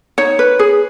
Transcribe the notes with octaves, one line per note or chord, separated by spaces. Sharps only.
D#4 C#5
B4
G#4